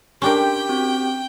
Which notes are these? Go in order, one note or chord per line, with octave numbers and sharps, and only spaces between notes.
C#4 D4 G4 A#4 G5 C6
C4 F#4